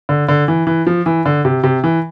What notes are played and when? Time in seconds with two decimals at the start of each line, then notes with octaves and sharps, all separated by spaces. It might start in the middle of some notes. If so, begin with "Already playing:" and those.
0.09 D3
0.29 D3
0.48 E3
0.67 E3
0.87 F3
1.06 E3
1.26 D3
1.45 C3
1.63 C3
1.84 E3